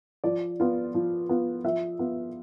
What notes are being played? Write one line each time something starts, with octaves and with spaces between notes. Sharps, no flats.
F3 D5
B3 F4
F3
B3 F4
F3 E5
B3 F4